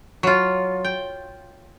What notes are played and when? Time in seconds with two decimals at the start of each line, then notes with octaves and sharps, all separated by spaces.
0.23 F#3 F4
0.84 G5